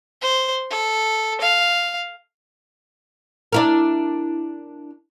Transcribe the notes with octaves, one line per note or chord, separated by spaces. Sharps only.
C5
A4
F5
D4 E4 A#4